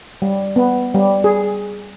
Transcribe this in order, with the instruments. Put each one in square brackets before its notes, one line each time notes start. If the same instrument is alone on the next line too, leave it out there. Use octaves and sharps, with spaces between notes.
[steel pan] G3
B3
G3
G#4